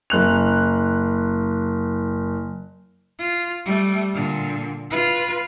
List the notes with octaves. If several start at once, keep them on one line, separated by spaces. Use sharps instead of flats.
F#1 F#6 F7
F4
G3 A3
A#2 D3
F4 B4